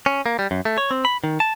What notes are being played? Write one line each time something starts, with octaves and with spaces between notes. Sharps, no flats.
C#4
A#3
G3
F#2
A3
C#5
C4
B5
D#3
A5